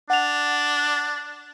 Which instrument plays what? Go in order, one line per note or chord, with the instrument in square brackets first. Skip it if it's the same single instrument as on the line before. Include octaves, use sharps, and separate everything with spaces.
[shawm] D4 [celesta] F#5 F7